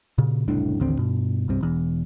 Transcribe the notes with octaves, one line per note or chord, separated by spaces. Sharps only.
A#2 C#3
F#1 C2 A2 D4
A1 D#2 D3 C4
G2 B2
C2 G2 C3
E1 E2